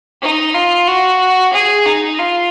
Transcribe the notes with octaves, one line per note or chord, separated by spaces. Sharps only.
D#4
F4
F#4
G#4
D#4
F4